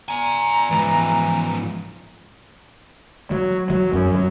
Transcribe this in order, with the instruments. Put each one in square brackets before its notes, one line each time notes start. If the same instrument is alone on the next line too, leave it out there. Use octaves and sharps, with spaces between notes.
[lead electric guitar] D5 G#5 [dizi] A#5
[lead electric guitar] G#2 F3 [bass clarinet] E3
[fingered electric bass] F#3
F#3
F#2
F#3